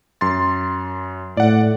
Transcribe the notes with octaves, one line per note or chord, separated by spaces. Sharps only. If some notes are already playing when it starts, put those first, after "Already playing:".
F#2 C6 A6
A2 D5 F#5